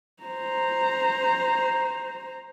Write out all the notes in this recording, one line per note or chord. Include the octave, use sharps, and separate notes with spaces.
C5 A#5